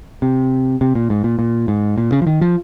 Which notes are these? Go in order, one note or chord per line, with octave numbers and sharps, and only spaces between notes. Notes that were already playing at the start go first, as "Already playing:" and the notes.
C3
C3
A#2
G#2
A#2
A#2
G#2
A#2
C#3
F3
D#3
F3